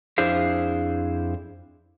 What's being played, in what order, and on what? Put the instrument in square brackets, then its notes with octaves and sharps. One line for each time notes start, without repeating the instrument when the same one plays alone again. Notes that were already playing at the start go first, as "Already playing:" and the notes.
[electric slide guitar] F2 D4 E4 G#4 C5 F5